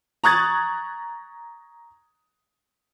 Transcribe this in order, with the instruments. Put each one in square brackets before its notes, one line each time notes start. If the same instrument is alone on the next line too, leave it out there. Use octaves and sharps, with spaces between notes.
[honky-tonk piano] A#5 C#6 D#6 F#6 G#6 A6